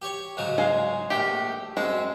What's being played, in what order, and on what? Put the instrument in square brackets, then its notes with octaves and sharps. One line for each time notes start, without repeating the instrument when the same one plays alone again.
[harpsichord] G4 C#5
G#2 C#3 F#3
[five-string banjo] G#3 F5 G#5
[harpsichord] A#1 A3 [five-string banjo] G4
[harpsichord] F#2 C4 [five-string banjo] G#3